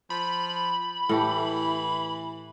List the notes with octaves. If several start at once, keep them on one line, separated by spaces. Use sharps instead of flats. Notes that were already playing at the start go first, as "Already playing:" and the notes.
F3 B5
A2 E3 A3 G4